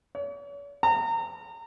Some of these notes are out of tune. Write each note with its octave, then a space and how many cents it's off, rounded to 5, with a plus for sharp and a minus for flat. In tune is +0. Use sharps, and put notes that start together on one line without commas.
C#5 +45
A#5 -30